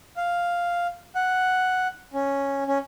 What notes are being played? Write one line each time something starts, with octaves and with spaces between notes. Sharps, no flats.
F5
F#5
C#4
C#4